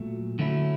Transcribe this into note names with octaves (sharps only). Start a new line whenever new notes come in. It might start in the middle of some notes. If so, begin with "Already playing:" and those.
Already playing: A#2 F#3 A3
D3 F#3 A3 C#4 E4